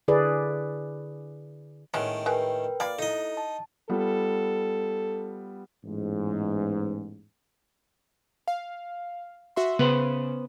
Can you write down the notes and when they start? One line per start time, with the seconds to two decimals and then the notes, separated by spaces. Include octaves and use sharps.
0.08 D3 E4 G#4 B4 D5
1.94 A2 D#3 G#3 B3 C#4
2.26 G#3 A#4 B4 G5
2.80 A#3 F4 D5 B5
2.99 D#4 E4 A4 D#5
3.37 A5
3.89 G3 B3 F4 A4
5.85 A1 E2 G#2
8.48 F5
9.56 F#4 E5 C6
9.79 C#3 B3 B4 C5